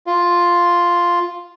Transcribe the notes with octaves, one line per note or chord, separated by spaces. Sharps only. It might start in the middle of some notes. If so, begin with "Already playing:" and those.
F4